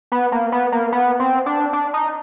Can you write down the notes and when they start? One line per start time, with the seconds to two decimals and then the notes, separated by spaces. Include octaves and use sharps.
0.12 B3
0.32 A#3
0.52 B3
0.72 A#3
0.92 B3
1.20 C4
1.46 D4
1.73 D4
1.94 D#4